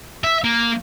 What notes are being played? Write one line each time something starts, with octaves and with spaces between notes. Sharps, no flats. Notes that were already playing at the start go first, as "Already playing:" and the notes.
E5
A#3